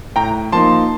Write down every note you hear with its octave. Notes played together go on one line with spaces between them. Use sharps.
A2 G5 A#5
F3 A#3 D#4 A5 C6